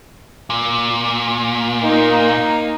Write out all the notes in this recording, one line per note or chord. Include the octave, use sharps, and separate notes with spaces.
A#2
A#3 D#4